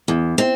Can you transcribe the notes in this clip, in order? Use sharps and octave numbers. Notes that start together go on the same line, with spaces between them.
E2
C4